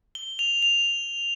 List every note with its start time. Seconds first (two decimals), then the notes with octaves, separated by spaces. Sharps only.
0.15 G7
0.39 F7
0.62 F7